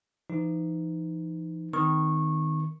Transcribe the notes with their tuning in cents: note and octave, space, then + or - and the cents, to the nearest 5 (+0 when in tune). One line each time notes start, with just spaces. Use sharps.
E3 +45 D#4 +0
D#3 +0 C4 -45 C#6 -20